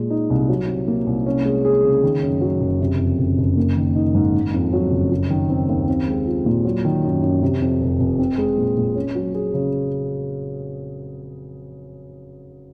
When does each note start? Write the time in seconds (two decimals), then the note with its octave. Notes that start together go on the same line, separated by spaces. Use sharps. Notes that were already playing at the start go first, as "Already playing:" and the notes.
Already playing: A#2 G#3
0.10 D#4
0.30 C2
0.49 F#3
0.68 C3
0.88 A#3
1.07 C2
1.26 C#4
1.45 G#3
1.65 G#4
1.84 C#3
2.03 D#3
2.23 F#2
2.41 F#3
2.61 F#1
2.80 C3
2.99 F2
3.19 F#1
3.38 F#1
3.57 A#3
3.76 D#3
3.96 D#4
4.15 G#2
4.34 D#3
4.54 F2
4.73 F#3
4.92 F#1
5.12 F#3
5.30 D#3
5.50 C4
5.69 D#2
5.88 C4
6.08 G#3
6.26 F4
6.46 A#2
6.65 F#3
6.85 D#3
7.04 F#2
7.22 F#2
7.42 C3
7.62 F2
7.81 F1
8.00 F1
8.19 C4
8.38 G#3
8.57 A#2
8.77 A#2
8.95 C#4
9.15 F#3
9.35 G#4
9.54 C#3